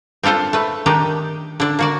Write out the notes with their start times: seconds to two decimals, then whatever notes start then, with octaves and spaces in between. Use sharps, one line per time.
0.23 C4 D4 F4 A4 C5
0.53 A3 B4
0.86 D#3 D4 D#4 G4
1.60 D3 D4
1.79 A#3 F#4 D5